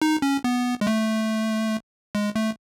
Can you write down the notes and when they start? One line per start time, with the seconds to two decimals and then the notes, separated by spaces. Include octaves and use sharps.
0.02 D#4
0.22 C#4
0.44 B3
0.81 G#3
0.87 A3
2.15 G#3
2.35 A3